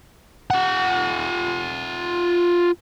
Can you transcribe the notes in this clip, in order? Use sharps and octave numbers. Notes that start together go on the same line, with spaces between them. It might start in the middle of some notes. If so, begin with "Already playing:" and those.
F4 F#5